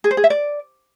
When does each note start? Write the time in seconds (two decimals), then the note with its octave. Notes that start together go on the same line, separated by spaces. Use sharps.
0.04 G#4
0.11 C5
0.17 G#4
0.24 E5
0.30 D5